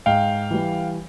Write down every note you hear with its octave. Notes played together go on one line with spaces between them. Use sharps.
G#2 F5 G5
E3 G3